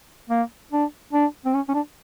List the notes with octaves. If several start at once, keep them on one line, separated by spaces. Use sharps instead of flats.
A#3
D4
D4
C4
C#4
C#4
D4